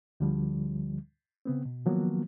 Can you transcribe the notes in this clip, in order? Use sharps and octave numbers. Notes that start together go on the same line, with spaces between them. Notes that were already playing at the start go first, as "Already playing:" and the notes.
D2 D3 F3 G3
C#3 B3 C4
B2
D#3 F3 F#3 A#3 B3